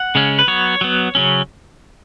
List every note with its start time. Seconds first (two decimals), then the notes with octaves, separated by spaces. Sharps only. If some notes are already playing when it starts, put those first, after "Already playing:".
Already playing: F#5
0.15 C#3 G#3 C#4
0.39 B4
0.47 F#3 B3 C#5
0.81 F#3 B3
1.15 C#3 F#3 C#4